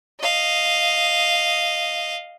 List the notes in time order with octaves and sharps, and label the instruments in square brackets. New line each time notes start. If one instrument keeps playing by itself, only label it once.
[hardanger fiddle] D#5 F5